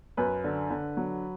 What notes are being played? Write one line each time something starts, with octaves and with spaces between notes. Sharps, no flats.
F#2 B4
D3
D3
F#3